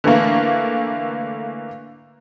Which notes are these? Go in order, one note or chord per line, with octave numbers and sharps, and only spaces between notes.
D3 E3 A3 A#3